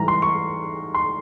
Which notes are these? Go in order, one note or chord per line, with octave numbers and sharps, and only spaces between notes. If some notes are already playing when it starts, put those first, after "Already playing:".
Already playing: G#2 E3 G3 A#5
C6
C#6
C6